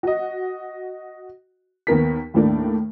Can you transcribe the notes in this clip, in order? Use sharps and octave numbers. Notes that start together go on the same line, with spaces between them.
F#4 D#5
D#2 B3 A#4 B6
D#2 A2 A3 A#3 D4